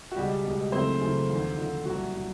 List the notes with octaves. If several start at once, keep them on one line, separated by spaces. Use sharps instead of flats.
F#4
C#2 B2 G3 G#3 G4
C#2 B2 G#3
F#2 C#3 E3 A3 C4 C5
F#2 C#3 E3 A3
D#2 D3 F3
D#2 D3 F3
C2 A#2 F#3 F#4
A#2 F#3